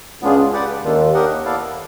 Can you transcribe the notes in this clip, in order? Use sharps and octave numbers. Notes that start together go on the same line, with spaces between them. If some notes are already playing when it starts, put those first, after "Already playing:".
C#2 C#3 B3 D4 F4 G#4
G4 B4 D5 F#5
D#2 D#3 D4 F4 A4
D4 G4 A#4 D#5 F#5
B3 E4 A4 D5 F5